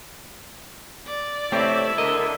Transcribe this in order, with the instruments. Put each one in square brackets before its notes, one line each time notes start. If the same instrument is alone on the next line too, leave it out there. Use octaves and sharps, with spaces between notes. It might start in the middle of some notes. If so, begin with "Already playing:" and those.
[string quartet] D5
[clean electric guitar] A3 C4 G4 [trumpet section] E4 E5 [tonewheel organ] C#5
[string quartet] D3 [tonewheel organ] A#4 [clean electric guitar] D#5